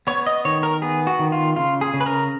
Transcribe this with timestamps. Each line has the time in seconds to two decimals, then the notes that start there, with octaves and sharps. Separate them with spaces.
0.07 B3 C#5
0.27 D#5
0.45 D#3 C#5
0.63 A#4
0.82 B3 G#4
1.07 F#4
1.19 D#3
1.32 F4
1.56 C#3 F4
1.81 G#4
1.94 C#3
2.01 B4
2.06 A#4